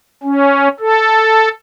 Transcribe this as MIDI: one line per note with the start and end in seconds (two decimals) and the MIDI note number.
0.23 0.68 61
0.80 1.49 69